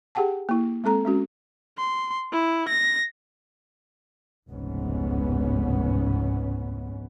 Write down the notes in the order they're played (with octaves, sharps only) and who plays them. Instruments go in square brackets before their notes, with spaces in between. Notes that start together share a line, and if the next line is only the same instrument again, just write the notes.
[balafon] G4 G#4 F#5 G5 A5
A#3 E4
G#3 C4 A4 A#5
G#3 C#4 F#4
[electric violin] C6
E4
A#6
[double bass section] F1 C#2 G#2 B3 C#4